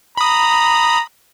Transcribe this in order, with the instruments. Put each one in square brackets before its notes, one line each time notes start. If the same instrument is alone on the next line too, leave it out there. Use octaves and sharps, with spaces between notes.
[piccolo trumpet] A#5 [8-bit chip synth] B5 D#6